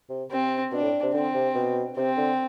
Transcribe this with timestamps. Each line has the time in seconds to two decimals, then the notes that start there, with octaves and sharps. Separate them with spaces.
0.10 C3
0.31 C3 C4
0.72 B2 D4
0.83 A2
1.03 C3
1.14 D3 C4
1.34 C3
1.55 B2
1.97 C3 C4
2.17 D3